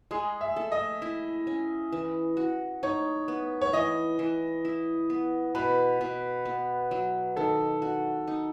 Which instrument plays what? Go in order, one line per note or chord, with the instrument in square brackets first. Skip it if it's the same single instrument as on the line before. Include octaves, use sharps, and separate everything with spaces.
[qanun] G#3 [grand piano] G#4
[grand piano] E5
[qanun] A4
[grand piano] D#5
[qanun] E4
C#4
E3
F#4
[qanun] D#4 [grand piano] C#5
[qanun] B3
[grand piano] C#5
[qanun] E3 [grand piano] D#5
[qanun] E3
E4
B3
[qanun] B2 [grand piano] B4
[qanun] B2
B3
F#3
[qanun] D#3 [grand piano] A4
[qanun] F#4
D#4